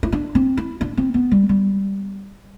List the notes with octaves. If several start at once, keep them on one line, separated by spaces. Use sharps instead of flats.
E4
D4
C4
E4
D4
C4
B3
G3
G3